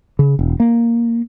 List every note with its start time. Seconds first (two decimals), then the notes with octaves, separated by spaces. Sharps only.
0.19 C#3
0.39 E1
0.60 A#3